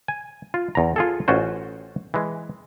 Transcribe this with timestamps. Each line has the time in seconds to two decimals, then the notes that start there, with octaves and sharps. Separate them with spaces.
0.08 G#5
0.54 F4
0.75 E2 A#5
0.96 F4 G#4 A4
1.28 A1 C#4 F4 F#4 C5
2.14 E3 G#3